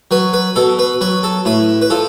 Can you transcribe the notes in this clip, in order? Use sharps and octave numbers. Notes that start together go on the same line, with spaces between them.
F#3 B4
B4
B2 A4
B4
F#3 B4
A4
A2 B4
B4
F3 A4